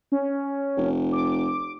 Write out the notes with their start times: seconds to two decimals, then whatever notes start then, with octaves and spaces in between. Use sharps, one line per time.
0.12 C#4
0.77 F1
1.12 D6